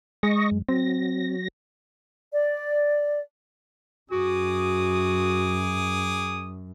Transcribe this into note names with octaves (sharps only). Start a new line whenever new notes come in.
G#3 D#5 C#6 A#6
F#2
F#3 C4 A#6
D5
F#2 F#4 G#4 D6 D#6